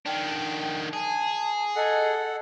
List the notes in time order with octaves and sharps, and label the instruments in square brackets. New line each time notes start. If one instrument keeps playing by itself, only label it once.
[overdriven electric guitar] D#3 D4 [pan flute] G5
[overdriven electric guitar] G#4 [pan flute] A5
[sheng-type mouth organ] A4 F#5 [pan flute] D#5